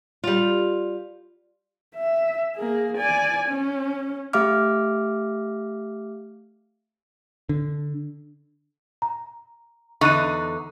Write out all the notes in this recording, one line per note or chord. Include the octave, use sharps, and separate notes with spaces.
G3 F4
E5
A#3 G#4
D5 G#5
C#4
A3 G4 E5 F5 D6 F6
D3
A#5
E2 D3 D#4 C#6 F#6 D#7